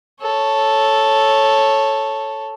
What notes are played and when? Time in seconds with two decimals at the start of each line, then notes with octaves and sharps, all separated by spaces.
0.22 A4 C#5